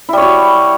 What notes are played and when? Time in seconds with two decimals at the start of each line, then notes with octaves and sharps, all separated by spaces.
0.09 E4
0.13 G3
0.17 C#5
0.22 F#4